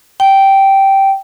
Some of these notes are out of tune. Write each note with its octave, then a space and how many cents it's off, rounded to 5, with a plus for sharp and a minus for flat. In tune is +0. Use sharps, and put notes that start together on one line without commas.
G5 -10